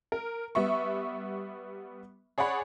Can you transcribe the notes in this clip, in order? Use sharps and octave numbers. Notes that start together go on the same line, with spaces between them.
A#4
G3 B3 E5 C#6
G#4 C#5 D5 F#5 B5